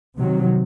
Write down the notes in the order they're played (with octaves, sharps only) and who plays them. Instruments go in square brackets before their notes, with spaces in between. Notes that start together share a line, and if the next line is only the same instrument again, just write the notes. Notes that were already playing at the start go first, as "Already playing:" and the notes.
[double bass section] C3 D#3 F#3